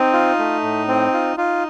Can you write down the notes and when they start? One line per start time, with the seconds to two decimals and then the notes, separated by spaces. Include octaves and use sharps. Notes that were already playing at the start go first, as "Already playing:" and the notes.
Already playing: C4 D#4
0.13 F4
0.39 A3
0.63 A2
0.88 C4
1.13 F4
1.37 D#4 F4